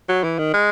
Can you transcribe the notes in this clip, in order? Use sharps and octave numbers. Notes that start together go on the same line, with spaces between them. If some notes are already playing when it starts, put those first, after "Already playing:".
F#3
E3
D#3
G#3